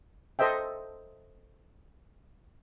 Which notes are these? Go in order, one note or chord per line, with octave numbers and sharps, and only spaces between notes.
A4 C5 D#5 E5 G5